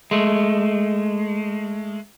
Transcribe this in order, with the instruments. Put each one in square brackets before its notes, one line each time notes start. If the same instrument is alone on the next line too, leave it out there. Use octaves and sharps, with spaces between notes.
[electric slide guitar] G#3 A3